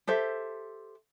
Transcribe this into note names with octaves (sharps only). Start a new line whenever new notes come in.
G4 A4 C5 E5